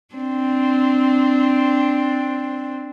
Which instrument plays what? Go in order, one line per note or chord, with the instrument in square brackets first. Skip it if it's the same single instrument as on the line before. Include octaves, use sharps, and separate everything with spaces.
[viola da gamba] C4 D4